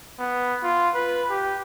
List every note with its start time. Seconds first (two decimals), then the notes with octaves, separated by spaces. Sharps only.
0.19 B3
0.63 F4
0.95 B4
1.30 G4